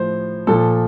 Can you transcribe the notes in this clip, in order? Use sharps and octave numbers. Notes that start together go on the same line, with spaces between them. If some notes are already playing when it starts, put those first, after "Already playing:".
Already playing: A2 F3 C5
A#2 F3 A4